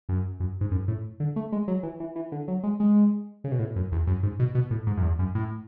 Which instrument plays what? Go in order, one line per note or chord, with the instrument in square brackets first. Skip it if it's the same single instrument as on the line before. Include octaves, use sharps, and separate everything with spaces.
[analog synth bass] F#2
F#2
G#2
F#2
A2
D3
A3
G#3
F#3
E3
E3
E3
D3
F#3
G#3
G#3
C#3
B2
A2
F#2
E2
F#2
G#2
B2
B2
A2
G#2
F#2
E2
F#2
A2